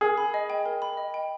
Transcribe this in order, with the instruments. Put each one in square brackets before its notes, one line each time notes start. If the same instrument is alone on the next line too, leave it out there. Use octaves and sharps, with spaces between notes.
[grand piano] G#4 [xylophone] A#4
[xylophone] B5
D#5
G5
A#4
B5
D#5
G5